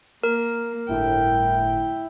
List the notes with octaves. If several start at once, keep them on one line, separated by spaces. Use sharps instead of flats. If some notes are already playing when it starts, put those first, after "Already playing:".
A#3 A#4
G1 A2 E4 G5